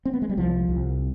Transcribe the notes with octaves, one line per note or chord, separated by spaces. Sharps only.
C4
B3
G#3
G3
C2 F3
C2